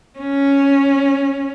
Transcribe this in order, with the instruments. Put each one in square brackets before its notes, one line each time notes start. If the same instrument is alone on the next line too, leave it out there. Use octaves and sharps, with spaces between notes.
[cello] C#4